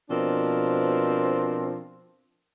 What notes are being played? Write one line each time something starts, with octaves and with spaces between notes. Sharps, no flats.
B2 F3 C4 D4 A#4